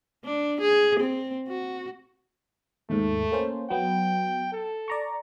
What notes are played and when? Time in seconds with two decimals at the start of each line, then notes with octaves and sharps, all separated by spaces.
0.25 D4
0.61 G#4
1.00 C4
1.48 F#4
2.90 D#2 G#2 A3
3.32 A#3 C#4 C5
3.70 F#3 B3 G5
4.53 A4
4.88 D5 A#5 C#6